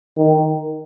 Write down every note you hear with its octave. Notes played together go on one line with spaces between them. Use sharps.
D#3